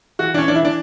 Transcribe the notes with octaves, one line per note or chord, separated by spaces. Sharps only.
E3 F#4
E3 C#4 D4
E3 D4
E4
E3 D4